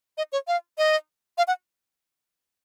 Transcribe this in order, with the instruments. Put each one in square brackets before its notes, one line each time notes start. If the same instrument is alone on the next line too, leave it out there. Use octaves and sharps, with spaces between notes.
[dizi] D#5
C#5
F5
D#5
F5
F#5